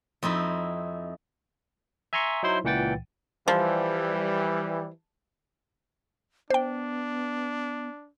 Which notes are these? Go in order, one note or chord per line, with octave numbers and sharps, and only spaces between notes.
F2 C4 D#4 E4
E5 G#5 A#5 C6 C#6
F#3 D#4 E4 C5 C6
C#2 A#2 E3 F#5 G5 A6
E3 F3 G3
B3 D4 C5 G5